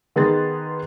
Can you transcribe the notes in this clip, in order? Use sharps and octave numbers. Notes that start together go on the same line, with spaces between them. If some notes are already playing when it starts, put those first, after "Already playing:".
D#3 B3 D#4 G#4 C6 A6